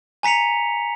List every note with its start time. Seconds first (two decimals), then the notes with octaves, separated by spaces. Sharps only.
0.23 G#5 A#5 B6 C#7 F7